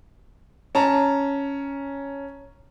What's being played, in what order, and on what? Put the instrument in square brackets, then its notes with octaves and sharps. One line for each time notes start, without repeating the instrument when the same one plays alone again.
[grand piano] C#4 A5 A#5